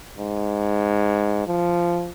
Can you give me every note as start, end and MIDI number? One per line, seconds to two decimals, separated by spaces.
0.18 1.45 44
1.47 2.11 53